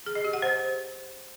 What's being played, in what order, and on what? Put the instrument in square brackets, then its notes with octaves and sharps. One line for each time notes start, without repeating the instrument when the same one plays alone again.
[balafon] G#4
D#5
G4
F#5
C5